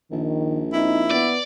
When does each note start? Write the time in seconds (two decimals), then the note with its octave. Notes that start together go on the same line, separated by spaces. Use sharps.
0.11 A#1 D#3
0.73 C4 D#4 E4
1.11 B3 D5